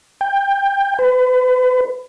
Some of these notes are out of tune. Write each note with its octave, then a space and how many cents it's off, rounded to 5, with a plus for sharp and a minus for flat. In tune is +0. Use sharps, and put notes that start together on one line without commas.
G5 +20
B4 +35